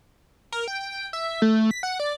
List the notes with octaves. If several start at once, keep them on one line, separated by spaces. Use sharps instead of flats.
A#4
G5
E5
A3
B6
F#5
D5